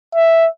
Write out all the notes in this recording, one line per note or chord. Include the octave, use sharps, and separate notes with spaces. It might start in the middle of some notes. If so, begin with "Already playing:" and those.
E5